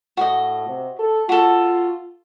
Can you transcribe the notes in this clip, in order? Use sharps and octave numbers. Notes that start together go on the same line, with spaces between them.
A2 F#4 D#5
C3
A4
F4 F#4 A4